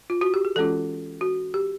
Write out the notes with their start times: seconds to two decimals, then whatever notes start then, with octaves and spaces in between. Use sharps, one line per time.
0.10 F4
0.21 F#4
0.34 G4
0.45 G#4
0.56 E3 G#3 C#4 F4 A4
1.21 F#4
1.54 G4